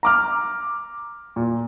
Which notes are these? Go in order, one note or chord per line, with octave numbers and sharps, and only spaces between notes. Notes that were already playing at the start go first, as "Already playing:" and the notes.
A#5 D6 F6
A#2